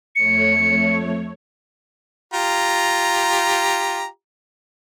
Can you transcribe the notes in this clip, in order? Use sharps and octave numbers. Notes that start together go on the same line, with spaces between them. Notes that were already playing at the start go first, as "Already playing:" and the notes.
F2 A3 C#5 C#7
F4 G4 A#5